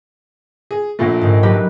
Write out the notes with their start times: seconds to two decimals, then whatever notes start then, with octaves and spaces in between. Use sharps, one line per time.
0.71 G#4
0.99 A#1 A#2 A3
1.21 G#2 D#3
1.43 F#3 G4 B4